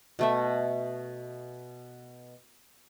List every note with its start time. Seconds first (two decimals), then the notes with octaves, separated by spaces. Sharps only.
0.19 B2 A3 E5